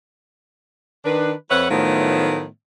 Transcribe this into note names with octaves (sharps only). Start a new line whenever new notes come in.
D#3 D4 B4
F2 B4 C#5 E5 F#5
A2 D#3 F3 F#3 A3 B3